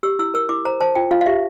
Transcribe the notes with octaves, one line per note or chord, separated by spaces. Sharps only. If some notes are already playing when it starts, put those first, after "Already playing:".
G4 E6
E4 E6
A#4 E6
E4 D6
C5 A#5
C5 A5
F4 G5
F4 F5
F5
G4 E5